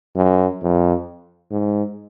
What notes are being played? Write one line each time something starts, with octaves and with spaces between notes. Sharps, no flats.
F#2
F2
G#2